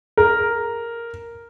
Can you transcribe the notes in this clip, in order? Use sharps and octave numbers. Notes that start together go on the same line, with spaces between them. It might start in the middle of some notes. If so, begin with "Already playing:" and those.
A#4